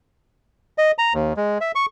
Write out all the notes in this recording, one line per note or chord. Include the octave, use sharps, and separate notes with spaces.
D#5
A#5
D#2
G#3
E5
C#6